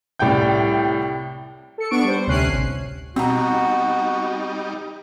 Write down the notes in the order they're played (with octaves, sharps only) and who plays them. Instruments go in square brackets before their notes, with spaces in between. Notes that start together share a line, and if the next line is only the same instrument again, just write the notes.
[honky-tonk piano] C2 A2 D5 G5 G6
[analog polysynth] A4 C#7
B3 D4 C#6 C#7 D7
G3 C5
D2 C3 C#4 F#6 C7 D#7
A1
[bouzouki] B2 B3 A#5 [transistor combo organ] G3 D#4 [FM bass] C4 [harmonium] F#4